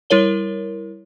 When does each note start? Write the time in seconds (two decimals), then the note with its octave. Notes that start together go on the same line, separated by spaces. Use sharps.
0.10 G3 E4 A#4 C#5 G7